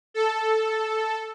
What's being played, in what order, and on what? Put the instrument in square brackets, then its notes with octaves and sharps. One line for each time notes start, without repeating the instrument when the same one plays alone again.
[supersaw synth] A4